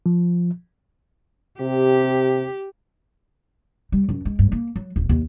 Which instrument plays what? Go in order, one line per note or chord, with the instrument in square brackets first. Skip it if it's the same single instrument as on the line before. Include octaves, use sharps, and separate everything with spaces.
[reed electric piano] F3
[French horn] C3 [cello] G4
[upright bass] G3
F#2
G#3
G2
A#3
F#3
D1
D#2